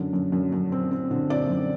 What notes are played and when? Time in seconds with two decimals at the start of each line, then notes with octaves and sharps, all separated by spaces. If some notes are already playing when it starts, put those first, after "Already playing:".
Already playing: F#2 D3
0.13 F#2
0.32 F#2
0.52 F#2
0.72 C4
0.91 C4
1.11 D3
1.30 C4 D5
1.49 F#2